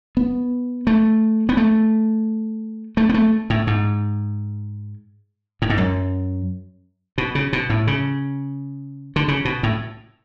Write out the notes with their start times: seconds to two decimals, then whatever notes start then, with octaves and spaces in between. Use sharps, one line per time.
0.17 B3
0.87 A3
1.49 B3
1.57 A3
2.97 A3
3.09 B3
3.14 A3
3.50 A2
3.67 G#2
5.62 A2
5.70 G#2
5.78 F#2
7.18 B2
7.35 C#3
7.53 B2
7.70 A2
7.87 C#3
9.16 D3
9.28 C#3
9.45 B2
9.63 A2